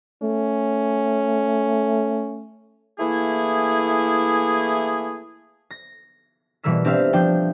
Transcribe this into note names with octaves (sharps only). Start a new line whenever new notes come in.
A3 C#4
E3 A3 A#3 E4 G#4
A#6
B2 E3 G3 A#3 E6 B6
C4 D4 G4 E5 F5
F3 D4 G5